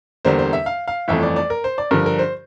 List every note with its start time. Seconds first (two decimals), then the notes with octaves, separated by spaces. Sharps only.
0.25 E2 D3 G3 A#3 C5
0.39 C5
0.53 E5
0.66 F5
0.88 F5
1.08 G1 F2 E3 A3 E5
1.23 D5
1.36 D5
1.50 A#4
1.64 C5
1.78 D5
1.91 G2 D3 F3 A#4
2.06 A#4
2.19 C5